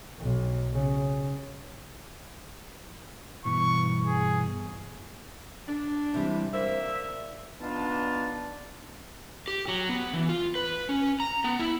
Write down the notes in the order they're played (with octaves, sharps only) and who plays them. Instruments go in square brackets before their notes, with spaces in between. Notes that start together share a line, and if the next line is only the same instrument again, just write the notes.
[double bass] B1
C#3
[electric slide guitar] G2 B2 E3 [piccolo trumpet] C#6
[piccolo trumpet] G#4
[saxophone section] D4
[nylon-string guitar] C3 E3 G3
[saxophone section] A#3 D4 E5 [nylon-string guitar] C5
[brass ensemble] B3 D4 D#4 F4 A5
[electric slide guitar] G4
F#3
B3
E3
F4
B4
C#4
A#5
B3
E4